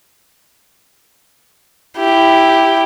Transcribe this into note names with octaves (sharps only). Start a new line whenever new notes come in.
E4 G4